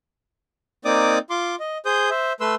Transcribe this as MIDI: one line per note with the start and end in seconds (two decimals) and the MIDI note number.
0.85 1.18 58
0.85 1.18 60
0.85 1.18 63
0.85 1.18 74
0.85 1.18 86
0.85 1.18 87
1.30 1.56 65
1.30 1.56 84
1.30 1.56 86
1.60 1.78 75
1.86 2.10 68
1.86 2.10 72
1.86 2.10 87
1.86 2.10 91
2.10 2.33 72
2.10 2.33 76
2.40 2.55 57
2.40 2.55 71
2.40 2.55 84
2.40 2.55 88